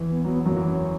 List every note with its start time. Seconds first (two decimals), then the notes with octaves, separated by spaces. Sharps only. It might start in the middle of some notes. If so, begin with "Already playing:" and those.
Already playing: E2 E3
0.09 B3
0.24 F#3 B3
0.46 F#2 F#3 A#3
0.56 E2 E3
0.67 C#4